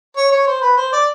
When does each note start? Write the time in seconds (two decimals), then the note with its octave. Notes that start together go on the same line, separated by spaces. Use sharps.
0.17 C#5
0.31 C#5
0.47 C5
0.62 B4
0.78 C5
0.92 D5